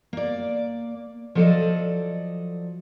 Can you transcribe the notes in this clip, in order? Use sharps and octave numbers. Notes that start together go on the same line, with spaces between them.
A#3 D5
F3 F#3 A4 B4 D5 D#5